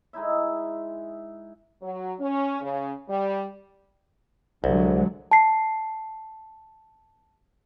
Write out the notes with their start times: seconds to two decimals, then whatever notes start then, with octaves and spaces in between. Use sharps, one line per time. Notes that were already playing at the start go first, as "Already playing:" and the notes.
0.13 G#3 D#4 E4 E5
1.82 F#3
2.19 C#4
2.61 C#3
3.08 G3
4.64 C2 D3 F#3 G#3
5.31 A5 C7